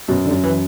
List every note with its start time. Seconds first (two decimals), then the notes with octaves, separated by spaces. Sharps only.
0.08 F#2 B2
0.26 D3
0.31 F#2
0.43 E3